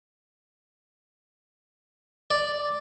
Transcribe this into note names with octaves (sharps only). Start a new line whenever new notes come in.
D5